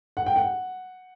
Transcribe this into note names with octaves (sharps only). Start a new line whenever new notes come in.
F#5
G5
F#5